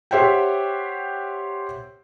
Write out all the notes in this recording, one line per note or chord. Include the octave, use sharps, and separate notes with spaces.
G4 C5 C#5 E5 F#5 G5